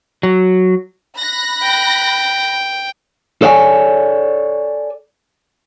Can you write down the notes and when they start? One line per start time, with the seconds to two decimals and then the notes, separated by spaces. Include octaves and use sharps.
0.23 F#3
1.16 B5 F#6 A#6
1.62 G5
3.42 A4 C#5 D5 F#5 G#5